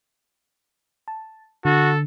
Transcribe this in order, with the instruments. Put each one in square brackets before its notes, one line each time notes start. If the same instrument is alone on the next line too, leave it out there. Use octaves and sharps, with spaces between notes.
[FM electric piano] A5
[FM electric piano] D3 [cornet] F#4 [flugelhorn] A4